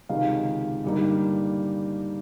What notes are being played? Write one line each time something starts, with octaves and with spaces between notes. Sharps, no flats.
C#2 C3 D#3 F5
G2 D3 G3 A#3 D#4